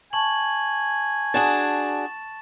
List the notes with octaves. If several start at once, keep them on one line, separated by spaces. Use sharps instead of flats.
G#5 A5 C#6 F#7
D4 F#4 G#4 A6 E7